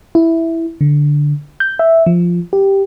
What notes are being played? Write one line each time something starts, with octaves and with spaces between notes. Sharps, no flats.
E4
D3
G6
E5
F3
G4